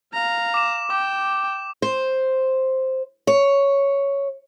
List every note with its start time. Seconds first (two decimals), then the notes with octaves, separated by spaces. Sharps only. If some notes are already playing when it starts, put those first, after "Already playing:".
0.13 F5 A#5
0.54 D6 E7
0.90 G5 D6
1.82 C5
3.27 C#5